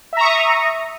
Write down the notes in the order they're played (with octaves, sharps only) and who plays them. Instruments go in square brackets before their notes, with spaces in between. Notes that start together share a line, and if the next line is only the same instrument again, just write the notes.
[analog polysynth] E5
A#5
C#6
D#6